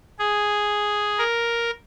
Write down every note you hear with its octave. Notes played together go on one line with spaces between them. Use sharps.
G#4
A#4